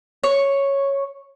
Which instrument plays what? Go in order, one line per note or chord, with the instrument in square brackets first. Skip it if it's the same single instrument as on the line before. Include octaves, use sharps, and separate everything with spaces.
[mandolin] C#5